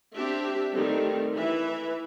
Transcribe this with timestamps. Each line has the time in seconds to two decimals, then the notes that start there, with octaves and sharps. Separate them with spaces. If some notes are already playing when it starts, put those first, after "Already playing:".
0.17 C4 D4 G4 E5
0.73 D#3 G3 A3 C4
1.33 E3 B4 E5